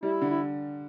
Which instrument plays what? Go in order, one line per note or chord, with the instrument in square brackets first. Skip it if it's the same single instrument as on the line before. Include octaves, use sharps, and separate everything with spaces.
[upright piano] G3 [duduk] E4
[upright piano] D3
[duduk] E4